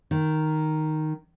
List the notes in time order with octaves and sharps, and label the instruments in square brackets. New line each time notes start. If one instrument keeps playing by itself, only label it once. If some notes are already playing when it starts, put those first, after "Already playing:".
[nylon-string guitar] D#3